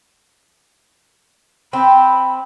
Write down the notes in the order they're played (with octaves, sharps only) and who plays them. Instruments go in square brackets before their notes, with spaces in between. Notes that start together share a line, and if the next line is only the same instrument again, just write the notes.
[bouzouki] C4 [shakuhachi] B5